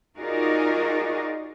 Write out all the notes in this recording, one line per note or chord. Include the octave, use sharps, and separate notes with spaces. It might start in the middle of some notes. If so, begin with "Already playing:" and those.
D#4 F4 F#4 G#4 A#4 D5